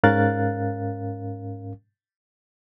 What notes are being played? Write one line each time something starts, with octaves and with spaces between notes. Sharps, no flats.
G#2 C#4 A#4 F5 F#6 A6